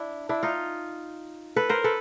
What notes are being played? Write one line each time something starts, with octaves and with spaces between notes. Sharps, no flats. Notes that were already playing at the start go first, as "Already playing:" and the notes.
Already playing: D4 E4
D4 E4
D#4 F4
A4 B4
A#4 C5
A4 B4